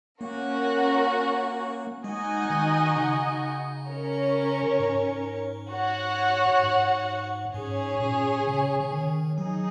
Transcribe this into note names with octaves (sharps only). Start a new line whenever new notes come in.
A#3 C#4 F#4 A#4
G#3 D#4 F#4 D#5 G#5
D#3
C#3
C#4 A#4 C#5
G#2
F#4 C#5 F#5
G#2
G#2 C#4 G#4 C#5 G#5
A#2
C#3
C#3
D#3
F#3 D#4 G#4